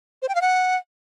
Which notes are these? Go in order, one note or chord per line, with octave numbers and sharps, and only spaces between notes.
C5
G5
F5
F#5